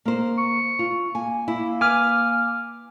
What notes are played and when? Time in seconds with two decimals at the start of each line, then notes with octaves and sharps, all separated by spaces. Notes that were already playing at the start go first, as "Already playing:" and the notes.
0.05 A#3 C5
0.38 C#6
0.79 F4
1.15 A#3 G#5
1.48 A#3 E4
1.81 B4 G#5 D6 F6